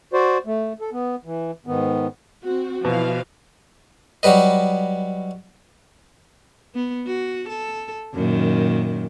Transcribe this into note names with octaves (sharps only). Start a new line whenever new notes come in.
F#4 C5 D5
A3
A4
B3
E3
G#2 D#3 B3
C4 F#4
B2 E3 F3 F5
F#3 G3 B4 D#5
B3
F#4
A4
F#2 A#2 D#3